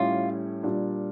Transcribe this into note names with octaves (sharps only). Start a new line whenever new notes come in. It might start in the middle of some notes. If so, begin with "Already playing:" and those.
Already playing: A2 G3 C#4 E4 F4 G4
A#2 G3 D4